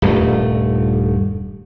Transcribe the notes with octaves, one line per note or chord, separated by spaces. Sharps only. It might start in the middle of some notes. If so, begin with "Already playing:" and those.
D#1 G2 A3